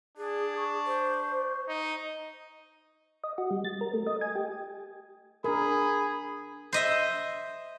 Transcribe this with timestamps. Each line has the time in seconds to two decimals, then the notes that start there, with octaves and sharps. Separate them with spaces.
0.18 D4 G#4
0.57 C#6
0.86 C5
1.68 D#4
3.24 D#5
3.38 F#4
3.50 G3
3.64 A6
3.81 A#4
3.94 A3
4.07 D#5
4.21 G#5
4.35 G4
5.44 D4 G#4 A#4 B5
6.73 C5 D#5 E5